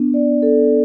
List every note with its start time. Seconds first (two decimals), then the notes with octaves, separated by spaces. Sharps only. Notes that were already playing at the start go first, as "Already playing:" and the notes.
Already playing: B3 D4
0.14 D5
0.42 A4